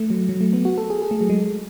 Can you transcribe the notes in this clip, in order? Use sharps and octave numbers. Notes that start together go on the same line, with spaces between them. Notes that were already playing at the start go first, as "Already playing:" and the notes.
Already playing: A3
F#3
F#3
A3
B3
F#4
A4
G#4
G#4
A3
F#3
G#3